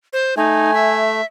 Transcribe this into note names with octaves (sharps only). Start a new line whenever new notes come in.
C5
A3 D#4 G#5
E5